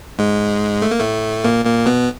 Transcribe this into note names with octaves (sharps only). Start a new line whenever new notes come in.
G#2 G#3
A3
A#3
A2 A3
A#2 A#3
A#2 A#3
B2 B3